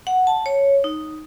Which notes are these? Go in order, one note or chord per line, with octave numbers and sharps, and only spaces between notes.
F#5
A5
C#5
D#4